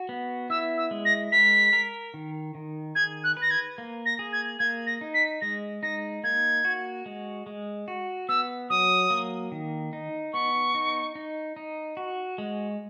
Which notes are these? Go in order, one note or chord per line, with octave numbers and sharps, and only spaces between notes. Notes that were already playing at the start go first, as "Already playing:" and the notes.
Already playing: F#4
B3
E4 E6
E6
G#3
A#6
A#4 B6
A#4
D#3
D#3
G#4 G#6
F#6
B4 A#6
G#6
A#3
A#6
G#4
G#6
A#3 G#6
A#6
D#4
B6
G#3 A#6
D#4 A#6
A#3 G#6
F#4
G#3
G#3
F#4
B3 E6
F#3 D#6
A#3
D#3
D#4
B3 C#6
D#4
D#4
D#4
F#4
G#3